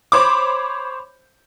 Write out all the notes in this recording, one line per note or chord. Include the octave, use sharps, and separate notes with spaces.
C5 C#5 B5 D6